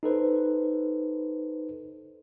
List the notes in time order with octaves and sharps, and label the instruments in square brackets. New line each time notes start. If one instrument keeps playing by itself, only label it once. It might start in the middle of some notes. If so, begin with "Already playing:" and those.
[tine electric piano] D#4 A4 B4 C5